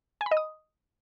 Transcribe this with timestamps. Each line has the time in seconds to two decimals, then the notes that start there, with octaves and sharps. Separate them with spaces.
0.21 G#5
0.26 B5
0.31 D#5
0.37 D#6